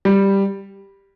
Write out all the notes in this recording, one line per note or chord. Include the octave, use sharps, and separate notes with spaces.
G3